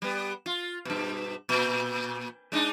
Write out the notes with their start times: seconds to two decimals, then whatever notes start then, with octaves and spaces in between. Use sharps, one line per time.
0.02 G3 B3
0.46 F4
0.85 G2 B2
1.49 A#2
2.52 G#3 D4 D#4